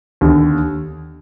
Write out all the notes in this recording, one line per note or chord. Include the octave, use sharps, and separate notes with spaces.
D#2 D3